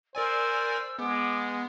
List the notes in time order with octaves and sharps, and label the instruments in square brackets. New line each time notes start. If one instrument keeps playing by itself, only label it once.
[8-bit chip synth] A#4 D5 G#5 [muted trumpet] C5 [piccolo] E6
[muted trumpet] G#3 [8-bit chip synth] B3 [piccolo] D6